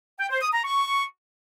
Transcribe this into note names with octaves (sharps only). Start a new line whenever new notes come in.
G5
C5
D#6
A#5
C#6